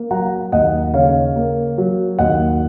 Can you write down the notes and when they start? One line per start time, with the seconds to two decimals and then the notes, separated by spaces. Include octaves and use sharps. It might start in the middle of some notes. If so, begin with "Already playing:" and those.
Already playing: A#3
0.11 F#3 F#5 A#5
0.52 D#2 D#5 F#5
0.94 C#3 C#5 F5
1.36 A#3
1.78 F#3
2.19 D#2 D#5 F#5